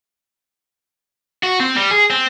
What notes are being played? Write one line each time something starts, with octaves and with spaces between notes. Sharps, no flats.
F#4
C4
G3
G#4
C4